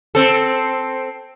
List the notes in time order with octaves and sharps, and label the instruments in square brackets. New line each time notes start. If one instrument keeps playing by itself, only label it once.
[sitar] C4 A4